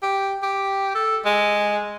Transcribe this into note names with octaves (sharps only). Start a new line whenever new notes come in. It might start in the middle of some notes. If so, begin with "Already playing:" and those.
G4
G4
A4
G#3